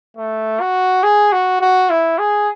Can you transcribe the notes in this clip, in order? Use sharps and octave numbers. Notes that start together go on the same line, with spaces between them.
A3
F#4
G#4
F#4
F#4
E4
G#4